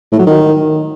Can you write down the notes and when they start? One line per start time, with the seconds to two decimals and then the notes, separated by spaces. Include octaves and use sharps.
0.12 A2
0.19 F#3
0.27 D#3